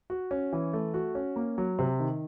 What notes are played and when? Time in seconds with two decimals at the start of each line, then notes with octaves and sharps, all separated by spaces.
0.10 F#4
0.31 C#4
0.53 E3
0.73 A3
0.94 F#4
1.15 C#4
1.36 A#3
1.58 F#3
1.79 C3
2.00 D#3